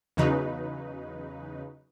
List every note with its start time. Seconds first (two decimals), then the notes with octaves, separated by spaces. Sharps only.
0.17 E2 C#3 F#3 D#4 B4